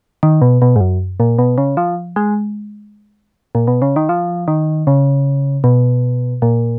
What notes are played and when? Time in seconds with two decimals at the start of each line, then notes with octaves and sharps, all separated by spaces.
0.23 D#3
0.42 B2
0.62 B2
0.76 G#2
0.81 F#2
1.20 A#2
1.39 B2
1.58 C#3
1.77 F3
2.16 G#3
3.55 A#2
3.68 B2
3.82 C#3
3.96 D#3
4.09 F3
4.48 D#3
4.87 C#3
5.64 B2
6.42 A#2